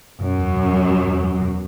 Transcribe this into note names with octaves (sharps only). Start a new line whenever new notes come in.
F#2 B2
E2
B2
F#3
F#3
E2
F#3
B2